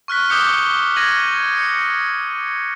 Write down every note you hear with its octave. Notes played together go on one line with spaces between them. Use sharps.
C#6 F6 F#6 B6
D6 D#6 G6 C#7 G7
G#6 A#6 D#7 F#7
C#7